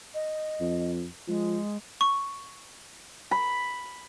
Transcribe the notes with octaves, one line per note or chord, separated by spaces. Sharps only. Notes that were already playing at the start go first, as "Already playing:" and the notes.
D#5
F2
F3 G#3
C#6
B5